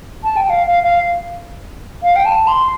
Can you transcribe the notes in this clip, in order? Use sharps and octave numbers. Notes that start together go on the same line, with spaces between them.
A5
G5
F5
F5
F5
F5
G5
A5
C6